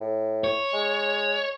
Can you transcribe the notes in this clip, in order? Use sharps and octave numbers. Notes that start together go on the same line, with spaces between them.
A2
C#5
G#3